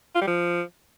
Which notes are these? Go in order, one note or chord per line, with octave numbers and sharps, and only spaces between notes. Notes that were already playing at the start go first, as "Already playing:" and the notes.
F4
G3
F3